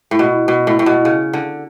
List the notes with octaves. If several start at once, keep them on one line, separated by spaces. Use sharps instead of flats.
A2
B2
B2
A2
A2
B2
C#3
D3